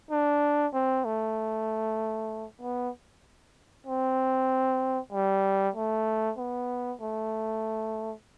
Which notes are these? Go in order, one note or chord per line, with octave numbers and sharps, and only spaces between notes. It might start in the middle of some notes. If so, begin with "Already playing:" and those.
D4
C4
A3
B3
C4
G3
A3
B3
A3